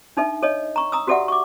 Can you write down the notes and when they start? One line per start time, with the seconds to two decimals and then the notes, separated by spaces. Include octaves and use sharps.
0.17 D4 D#4 A4 E5
0.43 A4 C#5 D#5
0.76 A#5 C#6
0.92 A#5 D#6 E6
1.07 F#4 G4 A4 D5 E5 F#5
1.28 C#6 D6